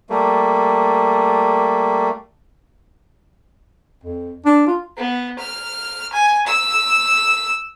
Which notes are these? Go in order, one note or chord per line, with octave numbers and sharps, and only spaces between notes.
G3 A3 A#3
F2
D4
F4
B3
F6
G#5
E6